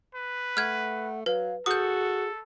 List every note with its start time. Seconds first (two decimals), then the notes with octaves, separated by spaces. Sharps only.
0.15 B4
0.57 A3 F#5 F6 G#6
1.26 F#3 B4 F5
1.66 F#4 G#4 A4 D#6 G6